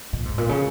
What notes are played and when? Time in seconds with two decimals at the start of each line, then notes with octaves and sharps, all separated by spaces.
0.13 A#2
0.25 G#2
0.38 A#2
0.49 C#3